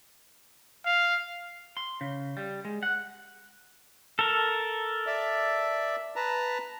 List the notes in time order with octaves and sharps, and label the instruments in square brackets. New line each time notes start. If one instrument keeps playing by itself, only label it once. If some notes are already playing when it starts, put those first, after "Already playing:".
[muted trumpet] F5
[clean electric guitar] C6
C#3
G3
G#3
F#5
[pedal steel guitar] A4 A#4
[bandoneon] D5 E5
B4 A5 A#5